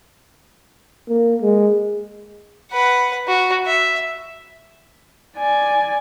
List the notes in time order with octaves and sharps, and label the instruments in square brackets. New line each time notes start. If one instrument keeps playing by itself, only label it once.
[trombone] A#3
G#3
[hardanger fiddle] B4 F#5
F#4
E5
[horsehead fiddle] D5 G#5